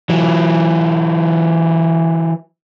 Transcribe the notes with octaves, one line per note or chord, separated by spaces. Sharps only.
E3 F#3